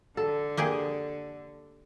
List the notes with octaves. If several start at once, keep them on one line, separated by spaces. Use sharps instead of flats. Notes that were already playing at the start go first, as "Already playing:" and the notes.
D3 A4
A#3 G4 G#4